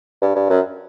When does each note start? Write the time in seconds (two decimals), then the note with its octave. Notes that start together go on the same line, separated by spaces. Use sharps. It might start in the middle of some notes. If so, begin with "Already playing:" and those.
0.21 G2
0.35 G2
0.50 F#2